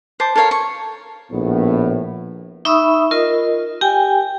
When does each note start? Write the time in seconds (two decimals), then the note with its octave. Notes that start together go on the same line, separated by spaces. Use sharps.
0.20 C5 A5 D6
0.36 A4 A#4 C#5 F5
0.51 C#6
1.31 A#1 A2 B3
2.65 D#4 E5 B5 C#6 D#6 E6
3.11 F4 A#4 D#5
3.81 G4 G5 G#5